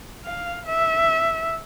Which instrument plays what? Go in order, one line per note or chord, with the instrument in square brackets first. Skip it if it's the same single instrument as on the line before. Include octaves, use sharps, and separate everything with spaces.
[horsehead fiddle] F5
E5